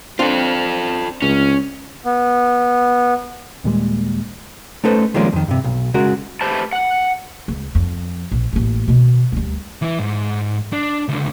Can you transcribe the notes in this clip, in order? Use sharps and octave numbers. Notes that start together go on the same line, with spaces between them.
C4 D4 F4 A4
C#2 C#4
B3
D#2 A#2 G3 G#3
A3 C#4 D#4 A4 B4 C5
D#3 F3 G3 G#3 A#3 C#4
F2 D#3
G2 C3
B1
C#3 G#3 F#4 A#4
A3 G4 B4 C5 A5
F#5
C#2
F2
A#1
A1 A#3
B2 D#3
D2 G3
E3 E4
G#2
D4
C#2 D3